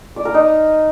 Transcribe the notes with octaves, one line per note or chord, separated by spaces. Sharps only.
D5
A#4
D#4